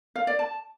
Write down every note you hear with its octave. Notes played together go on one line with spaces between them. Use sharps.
F5
D5
A5